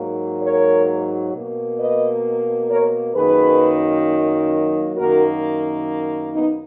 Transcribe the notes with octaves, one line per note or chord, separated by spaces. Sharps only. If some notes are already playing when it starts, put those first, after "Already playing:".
Already playing: G#2 F#3 A#3
A#4 C#5
B2 A#3
B4 D#5
A#4 C#5
F#2 D#3 F#3 A#3 G#4 B4
F#2 D#3 A#3 F#4 A#4
B3 D#4